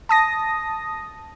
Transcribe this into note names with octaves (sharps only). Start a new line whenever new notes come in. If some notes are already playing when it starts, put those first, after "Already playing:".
A5 D#6 A#6